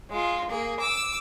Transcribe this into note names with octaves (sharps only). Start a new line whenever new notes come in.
G#3 F4
A#3 G#4
D6 E6